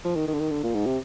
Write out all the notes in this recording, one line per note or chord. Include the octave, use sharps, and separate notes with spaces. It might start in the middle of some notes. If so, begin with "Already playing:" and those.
F3
D#3
D#3
D3
D#3
D3
A#2
G#2
C3